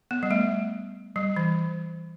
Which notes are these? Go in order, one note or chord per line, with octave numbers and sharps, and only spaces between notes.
B3
G3
A3
G3
E3